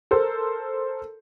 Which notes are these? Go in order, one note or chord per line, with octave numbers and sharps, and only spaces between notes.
A4 A#4 C5